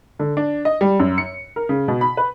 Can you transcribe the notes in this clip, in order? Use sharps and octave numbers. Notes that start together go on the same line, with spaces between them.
D3
D4
D#5
G3
F#2
C#7
A#4
C#3
B2
B5
B4